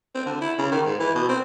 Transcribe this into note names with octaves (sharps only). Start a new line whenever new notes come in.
C4
D3
E4
C#3
D#3
G#2
E3
B2
C4